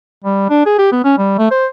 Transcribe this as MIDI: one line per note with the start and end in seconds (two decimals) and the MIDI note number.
0.24 0.48 55
0.50 0.64 62
0.66 0.77 68
0.78 0.88 67
0.92 1.03 59
1.04 1.14 61
1.18 1.37 55
1.38 1.48 57
1.51 1.66 72